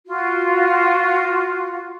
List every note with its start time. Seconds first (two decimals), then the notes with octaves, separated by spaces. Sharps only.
0.06 F4 F#4